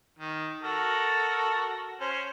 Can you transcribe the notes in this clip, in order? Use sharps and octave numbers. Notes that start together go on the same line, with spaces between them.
D#3
F#4 A4 A#4
C#4 C5